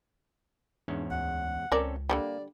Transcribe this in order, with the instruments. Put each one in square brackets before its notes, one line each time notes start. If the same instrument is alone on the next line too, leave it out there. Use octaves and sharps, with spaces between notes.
[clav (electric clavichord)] E2 G#2 C#4 [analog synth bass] D4
[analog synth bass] D2 [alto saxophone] F#5
[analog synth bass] C#2 [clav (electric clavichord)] C4 C#4 A4 [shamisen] A#4 D5
[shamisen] D3 F#3 G3 [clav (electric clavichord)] A#3 [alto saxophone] D5